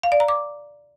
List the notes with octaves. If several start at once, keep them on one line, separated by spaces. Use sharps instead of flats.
F5
D5
A#5
D6